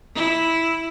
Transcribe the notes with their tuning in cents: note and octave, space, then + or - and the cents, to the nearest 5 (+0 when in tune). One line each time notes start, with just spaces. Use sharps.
E4 -5